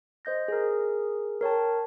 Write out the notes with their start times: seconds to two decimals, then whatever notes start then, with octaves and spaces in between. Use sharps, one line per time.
0.25 C5 D#5 G6 A#6
0.48 G#4 A#4
1.41 A#4 C#5 G5 A5